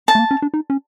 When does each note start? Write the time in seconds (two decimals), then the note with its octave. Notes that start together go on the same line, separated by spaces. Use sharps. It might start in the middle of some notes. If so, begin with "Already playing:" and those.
0.08 A5
0.15 A3
0.19 A#3
0.31 C#4
0.42 D4
0.54 D#4
0.70 C#4